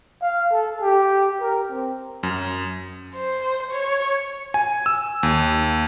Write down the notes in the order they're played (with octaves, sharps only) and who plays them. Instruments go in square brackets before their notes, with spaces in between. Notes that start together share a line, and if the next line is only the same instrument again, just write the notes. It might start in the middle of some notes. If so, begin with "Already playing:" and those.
[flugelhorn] F5
A4
G4
A#4
C4
[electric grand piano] F#2
[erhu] C5
C#5
[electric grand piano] G#5
E6
D#2